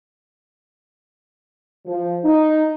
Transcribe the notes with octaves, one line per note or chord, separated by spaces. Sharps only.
F3
D#4